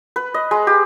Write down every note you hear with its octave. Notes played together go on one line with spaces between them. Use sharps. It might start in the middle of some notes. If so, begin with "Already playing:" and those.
B4
D#5
G#3
G4